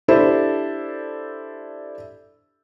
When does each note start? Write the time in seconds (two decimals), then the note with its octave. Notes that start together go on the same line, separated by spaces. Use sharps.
0.08 D4 E4 G4 A4 C5